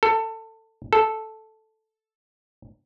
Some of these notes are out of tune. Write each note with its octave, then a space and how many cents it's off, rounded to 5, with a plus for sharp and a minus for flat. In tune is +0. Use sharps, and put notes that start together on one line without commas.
A4 +20
A4 -5